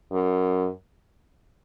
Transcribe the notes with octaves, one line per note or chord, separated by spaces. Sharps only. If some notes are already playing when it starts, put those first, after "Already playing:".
F#2